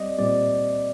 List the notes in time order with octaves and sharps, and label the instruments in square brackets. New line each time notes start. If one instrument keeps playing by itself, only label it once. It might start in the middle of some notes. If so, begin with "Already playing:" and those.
Already playing: [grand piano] G3 C4 [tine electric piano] D5 D#5
[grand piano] A#2 G3 C4 [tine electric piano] D5